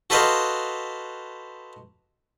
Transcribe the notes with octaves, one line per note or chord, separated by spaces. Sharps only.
F#4 A4 B4 C5 D#5 F5